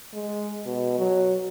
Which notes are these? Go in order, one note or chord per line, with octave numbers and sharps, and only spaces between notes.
G#3
B2
F#3